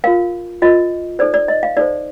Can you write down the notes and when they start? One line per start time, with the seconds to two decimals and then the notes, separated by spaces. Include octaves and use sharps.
0.04 F4 A#4 F5
0.62 F4 A#4 D#5
1.19 D#4 A4 C5 D5
1.34 D5
1.48 D#5
1.63 F5
1.77 D#4 A4 C5 D5